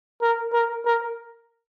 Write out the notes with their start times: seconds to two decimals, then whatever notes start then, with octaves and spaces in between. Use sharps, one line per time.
0.22 A#4
0.53 A#4
0.85 A#4